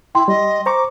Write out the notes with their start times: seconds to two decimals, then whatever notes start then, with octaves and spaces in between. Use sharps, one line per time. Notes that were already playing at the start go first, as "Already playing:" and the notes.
0.15 E4 G5 C6
0.28 G3 D#5
0.66 C5 A#5 C#6 D6